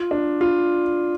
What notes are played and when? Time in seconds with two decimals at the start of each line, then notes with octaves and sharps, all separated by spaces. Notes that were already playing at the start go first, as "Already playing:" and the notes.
Already playing: F4
0.11 D4
0.41 F4